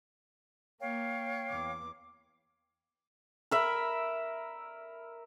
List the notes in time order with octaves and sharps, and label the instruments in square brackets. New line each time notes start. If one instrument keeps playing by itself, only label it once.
[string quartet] A#3 [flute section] C#5 F5 G5
[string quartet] E2 D6
[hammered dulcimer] A#4 E5 B5